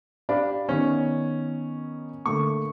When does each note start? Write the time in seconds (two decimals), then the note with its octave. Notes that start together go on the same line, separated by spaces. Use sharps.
0.29 D4 G4 F5 B5
0.69 D#3 B3 C#4
2.26 D3 A3 A#3 C#6